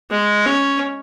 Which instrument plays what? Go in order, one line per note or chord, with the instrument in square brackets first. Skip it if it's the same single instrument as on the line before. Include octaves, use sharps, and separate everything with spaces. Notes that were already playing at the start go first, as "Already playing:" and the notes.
[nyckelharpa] G#3
C#4